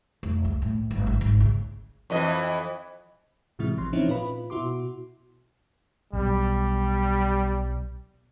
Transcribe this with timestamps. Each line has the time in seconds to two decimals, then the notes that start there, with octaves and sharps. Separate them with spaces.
0.23 F1
0.45 C#2
0.62 A2
0.91 G1
1.06 A1
1.21 G#1
1.40 C#3
2.10 F2 E3 D#5
3.59 A2 C3 E3 G#3 E4
3.77 A1 C3 F3 C6
3.93 E3 F3 C4 C#4 D#4 E4
4.08 A#2 F4 B4 B5
4.50 B2 E4 F#4 C6 D6
6.13 B1 G3